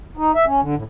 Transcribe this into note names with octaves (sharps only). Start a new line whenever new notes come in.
D#4
E5
C#4
D3
A2